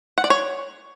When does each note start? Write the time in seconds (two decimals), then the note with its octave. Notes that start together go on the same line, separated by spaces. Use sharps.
0.18 F#5
0.24 D5
0.30 C#5